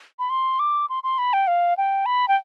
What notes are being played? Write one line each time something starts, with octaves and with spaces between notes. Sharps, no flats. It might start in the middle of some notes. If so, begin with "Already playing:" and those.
B5
C6
D6
C6
C6
B5
G5
F5
G5
B5
G5